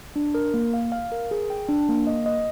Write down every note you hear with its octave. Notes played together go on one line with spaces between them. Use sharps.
D4
A#4
A#3
F5
F5
A#4
G#4
G5
D4
A#3
D#5
D#5